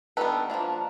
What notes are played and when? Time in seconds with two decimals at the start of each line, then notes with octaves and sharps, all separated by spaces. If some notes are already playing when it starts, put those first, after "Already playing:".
0.17 D#3 G3 B3 D4 A4 B4
0.50 F3 A#3 D4